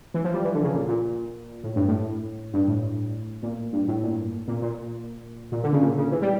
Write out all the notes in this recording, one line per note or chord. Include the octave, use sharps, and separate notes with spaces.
E3
F3
G3
E3
D3
C#3
A#2
A#2
A2
G2
A2
G2
A2
A#2
G2
A2
A#2
A#2
A#2
A#2
D3
C#3
A#2
C#3
E3
G3